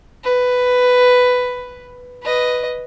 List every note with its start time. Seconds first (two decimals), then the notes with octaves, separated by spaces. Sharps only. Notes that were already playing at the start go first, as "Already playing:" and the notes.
0.24 B4
2.23 B4 D#5